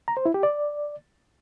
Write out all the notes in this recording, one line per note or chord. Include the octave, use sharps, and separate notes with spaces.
A#5
C5
E4
G4
D5